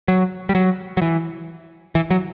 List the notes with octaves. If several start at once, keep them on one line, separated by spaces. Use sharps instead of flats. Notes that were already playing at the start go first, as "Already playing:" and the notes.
F#3
G3
F#3
F#3
E3
E3
F#3